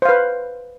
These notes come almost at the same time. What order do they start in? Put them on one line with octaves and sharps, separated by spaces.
C5 F5 B4